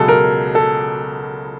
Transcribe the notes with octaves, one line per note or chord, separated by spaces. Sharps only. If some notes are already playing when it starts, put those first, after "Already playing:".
Already playing: C#2 B2 F#3 G#4 A4
A#4
A4